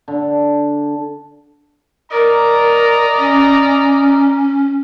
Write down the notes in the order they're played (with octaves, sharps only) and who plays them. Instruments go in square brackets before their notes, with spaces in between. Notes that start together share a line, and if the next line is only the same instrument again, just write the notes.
[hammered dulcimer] D3
[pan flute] A#4 [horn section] D5 D#5 A#5
[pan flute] C#4